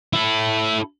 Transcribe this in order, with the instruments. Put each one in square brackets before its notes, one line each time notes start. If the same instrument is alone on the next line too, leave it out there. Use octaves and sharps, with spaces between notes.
[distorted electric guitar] E4 A4